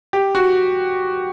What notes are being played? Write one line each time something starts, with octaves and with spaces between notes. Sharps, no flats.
G4
F#4